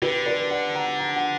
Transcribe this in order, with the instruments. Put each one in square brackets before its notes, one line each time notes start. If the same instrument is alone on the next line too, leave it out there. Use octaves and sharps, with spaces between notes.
[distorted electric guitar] D3 [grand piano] G4 B4
[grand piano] B4 D5
D5 F#5
F#5 A#5
F#5 A#5
F#5